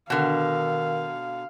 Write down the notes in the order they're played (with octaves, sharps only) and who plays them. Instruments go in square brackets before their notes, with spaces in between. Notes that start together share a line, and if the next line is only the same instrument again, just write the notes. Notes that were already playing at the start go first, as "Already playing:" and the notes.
[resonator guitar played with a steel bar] B2 D3 [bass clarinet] D#3 [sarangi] F5